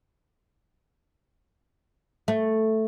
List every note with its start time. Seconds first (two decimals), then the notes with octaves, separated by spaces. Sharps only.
2.28 A3